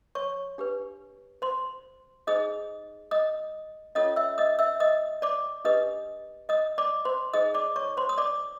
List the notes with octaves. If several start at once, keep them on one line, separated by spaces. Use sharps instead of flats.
C#5 C#6
D4 G4 B4
C5 C6
D#4 G#4 C5 D#5 D#6
D#5 D#6
C#4 F4 A4 C#5 D#5 D#6
E5 E6
D#5 D#6
E5 E6
D#5 D#6
D5 D6
D4 G4 B4 D#5 D#6
D#5 D#6
D5 D6
C5 C6
D#4 G#4 C5 D#5 D#6
D5 D6
C#5 C#6
C5 C6
D#6
D5 D6